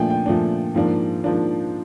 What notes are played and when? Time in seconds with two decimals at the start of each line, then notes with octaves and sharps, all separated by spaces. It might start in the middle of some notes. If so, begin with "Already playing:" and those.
Already playing: A#2 F3 A3 D4 G5 G#5
0.10 G5
0.26 A#2 F3 A3 D4
0.75 G#2 F3 A#3 D4
1.24 G#2 F3 A#3 D4